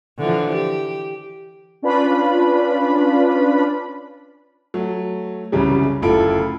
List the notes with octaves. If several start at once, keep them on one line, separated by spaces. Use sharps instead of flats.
D3 E3 F3
G4
C#4 D4 F4 B4 B5
F#3 A3
C2 F#2 C#3 E3 F#3 G3
F#1 D2 E4 F4 A4 D7